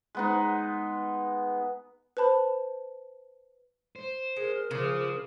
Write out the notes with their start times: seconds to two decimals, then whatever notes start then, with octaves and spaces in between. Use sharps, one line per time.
0.15 G#3 B3 D#4
2.17 B4 C5 A5 B5
3.96 C5
4.36 G#3 A#4
4.71 C#3 F4 G#4 C5 D6 D#6